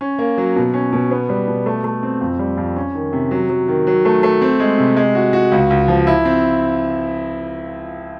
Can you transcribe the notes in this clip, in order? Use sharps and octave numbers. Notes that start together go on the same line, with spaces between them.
C#4
A#3
F#3
B2
C#4
B2
B3
G3
B2
A3
A3
C4
F2
G3
F2
C#4
D#3
C3
F#3
F#3
D#3
F#3
A3
A3
C4
G#3
C3
G#3
F#4
F#4
C#2
C#2
F3
E4
C4